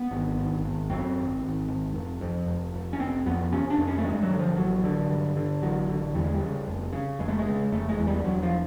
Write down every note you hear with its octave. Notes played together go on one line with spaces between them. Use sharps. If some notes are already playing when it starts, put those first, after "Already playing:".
Already playing: B3
G#1
G#1
G#1
F#2 C4
G#1
G#1
G#1
F1
F2
F1
F1
C#4
F1 C4
F2 B3
C3 C#4
D4
F2
C#4
A3
G2 G#3
F#3
D3
F3
A1 F#3
D3
G2
D3
A1 F#3
D3
E2 G3
G#3
G3
C#3
F1
C#3
F1 G#3
A3
G#3
C#3
F1 A3
G#3
E2
G3
E1 F#3
F3